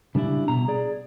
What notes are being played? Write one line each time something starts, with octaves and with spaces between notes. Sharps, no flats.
C#3 G3 D4 E4
B2 A#5
G#4 D5